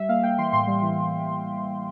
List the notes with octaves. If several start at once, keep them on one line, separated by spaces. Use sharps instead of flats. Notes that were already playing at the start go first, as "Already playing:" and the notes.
Already playing: G3 E5
A#3 F5
A#3 G5
E3 C6
A2 C6
G3
E3